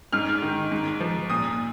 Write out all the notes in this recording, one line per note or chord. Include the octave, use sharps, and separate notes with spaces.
G#2 F6
D#3
G#2
F3
A#2 D#6